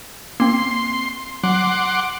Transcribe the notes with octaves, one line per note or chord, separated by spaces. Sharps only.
A#3 C4 C6
F#3 F#5 C6 D6